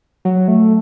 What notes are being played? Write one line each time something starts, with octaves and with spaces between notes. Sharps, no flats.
F#3
A3